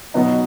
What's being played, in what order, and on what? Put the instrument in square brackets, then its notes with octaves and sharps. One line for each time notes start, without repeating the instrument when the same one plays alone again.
[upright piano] B2 F#3 B3 D#4